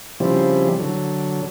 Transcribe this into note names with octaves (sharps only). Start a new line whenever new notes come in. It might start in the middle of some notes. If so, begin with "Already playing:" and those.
C#3 F3 G3 C4 E4
D3 F#3